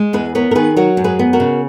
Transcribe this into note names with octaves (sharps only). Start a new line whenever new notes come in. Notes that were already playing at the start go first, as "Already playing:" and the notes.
Already playing: G#3
E2 G#4 B4
B3 A#4 C#5
A#4
D#3 G#4 B4
F#3 F#4 A#4
F#2
G#4 B4
B3
F#4 A#4
C#3